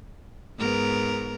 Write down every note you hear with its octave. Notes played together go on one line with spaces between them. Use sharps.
G#2 B3 A#4